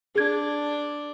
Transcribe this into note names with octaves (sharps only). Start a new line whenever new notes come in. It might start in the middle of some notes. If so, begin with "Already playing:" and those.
D4 G#4 G#6